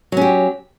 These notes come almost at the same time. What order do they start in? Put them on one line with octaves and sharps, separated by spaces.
F#3 C#4 G4